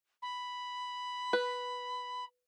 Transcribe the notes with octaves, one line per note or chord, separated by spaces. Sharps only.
B5
B4